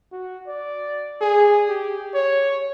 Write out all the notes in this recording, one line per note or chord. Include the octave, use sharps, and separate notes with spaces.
F#4
D5
G#4
G4
C#5